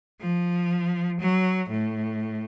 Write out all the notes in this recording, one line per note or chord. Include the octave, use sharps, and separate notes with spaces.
F3
F#3
A2